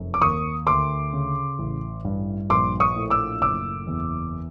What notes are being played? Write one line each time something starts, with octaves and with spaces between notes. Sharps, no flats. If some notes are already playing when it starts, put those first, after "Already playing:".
Already playing: F1 F#2
D6
D#2 C#6 D#6
D2 C6 D6
C#3
A1
G2
A#1 C6 D6
C#6 D#6
A2
D6 E6
F#1 D6 E6
E2